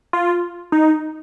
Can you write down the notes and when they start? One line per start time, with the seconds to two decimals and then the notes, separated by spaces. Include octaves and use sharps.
0.13 F4
0.72 D#4